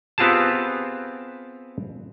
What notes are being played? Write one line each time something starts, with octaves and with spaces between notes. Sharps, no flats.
B3 C4 F4 G4 G#4 A5